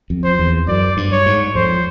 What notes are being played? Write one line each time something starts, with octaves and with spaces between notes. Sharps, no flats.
F2
C5
E2
F#2 D5
G2
C#5
G#2
F2 C5